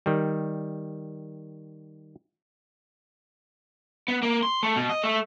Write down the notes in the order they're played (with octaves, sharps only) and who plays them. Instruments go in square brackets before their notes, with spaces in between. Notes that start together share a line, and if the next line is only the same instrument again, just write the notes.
[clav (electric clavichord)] D#3 G3
[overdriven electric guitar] B3
A#3
C6
A3
B2
D#5
A3